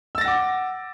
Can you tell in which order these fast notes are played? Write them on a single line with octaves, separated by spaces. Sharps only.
E6 A6 A#6 F#5 D6